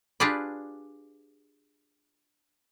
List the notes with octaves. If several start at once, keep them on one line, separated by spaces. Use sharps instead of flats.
D4 F4 G4 G#4 B4 D5